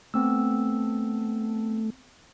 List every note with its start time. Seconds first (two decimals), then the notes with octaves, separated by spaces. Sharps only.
0.14 A3 B3 C4 E6